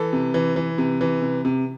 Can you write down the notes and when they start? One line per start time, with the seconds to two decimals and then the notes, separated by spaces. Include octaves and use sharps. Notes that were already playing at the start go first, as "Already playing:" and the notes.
Already playing: E3 A4
0.13 C3
0.34 E3
0.56 E3
0.78 C3
1.01 E3
1.22 C3
1.45 C3